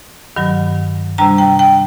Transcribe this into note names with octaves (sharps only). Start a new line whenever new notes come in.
G2 D#3 F#3
C3 G3 D4 A#5
G5
G5